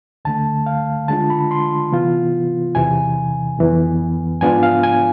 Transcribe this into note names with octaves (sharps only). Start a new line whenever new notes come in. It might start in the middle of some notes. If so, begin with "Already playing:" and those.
D2 D3 A3 A5
F5
D3 G#3 D4 F4 A5
B5
C6
C3 E3 B3 F4
E2 C3 E3 G#5
F2 E3 B3
G#2 F3 B3 D4 F4 G#5
F5
G#5